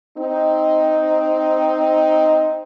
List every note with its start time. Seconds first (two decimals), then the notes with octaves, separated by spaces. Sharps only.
0.17 C4 D#4